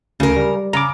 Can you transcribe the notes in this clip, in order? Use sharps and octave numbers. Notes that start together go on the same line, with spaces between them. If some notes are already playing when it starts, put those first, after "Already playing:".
D2 C#3 A#4
G3
C#3 A#5 D6